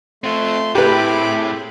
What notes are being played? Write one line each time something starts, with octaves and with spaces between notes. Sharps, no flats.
A3 C4 F4 C6
A2 C4 E4 G4 G#4 B4 B5 D6